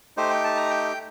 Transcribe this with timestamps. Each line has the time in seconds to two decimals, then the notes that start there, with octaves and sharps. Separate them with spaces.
0.17 A3 D#4 G4 C5
0.30 G5
0.44 A5
0.57 A#5
0.70 G5